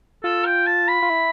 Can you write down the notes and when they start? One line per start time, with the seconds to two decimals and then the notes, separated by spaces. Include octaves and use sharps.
0.24 F4 A4
0.45 G5
0.67 A5
0.88 B5
1.02 F4
1.10 E4